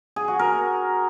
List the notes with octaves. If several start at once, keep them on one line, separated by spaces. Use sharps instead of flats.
G#4
F#4
A#4